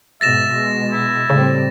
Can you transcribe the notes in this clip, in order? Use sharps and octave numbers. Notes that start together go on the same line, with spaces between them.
G#2 B2 E5 A6 A#6 E7
B2 G#3
E4
A2 C#3 G3 C4